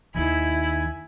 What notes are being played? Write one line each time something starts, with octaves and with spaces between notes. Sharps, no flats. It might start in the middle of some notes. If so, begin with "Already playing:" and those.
D#2 D#3 E4 G#5